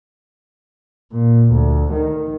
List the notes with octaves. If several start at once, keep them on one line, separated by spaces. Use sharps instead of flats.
A#2
D2
D#3